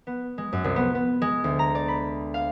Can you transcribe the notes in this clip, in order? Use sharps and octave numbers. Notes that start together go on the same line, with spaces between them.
B3
G#3
F#2
C2
B3
B3
G#3
D2
A#5
D5
B5
F5